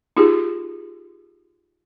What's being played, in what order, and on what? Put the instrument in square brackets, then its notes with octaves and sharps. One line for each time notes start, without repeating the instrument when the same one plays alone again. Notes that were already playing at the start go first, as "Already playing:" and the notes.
[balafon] D#4 F4 G4 G#4